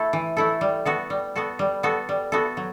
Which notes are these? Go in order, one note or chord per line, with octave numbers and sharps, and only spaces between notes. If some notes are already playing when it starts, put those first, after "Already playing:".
Already playing: A3 E4 A4
E3
A3 E4 A4
G3
B3 F#4 A4
G3
B3 F#4 A4
G3
B3 F#4 A4
G3
B3 F#4 A4
F#3